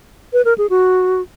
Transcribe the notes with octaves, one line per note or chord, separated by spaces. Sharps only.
B4
A#4
G#4
F#4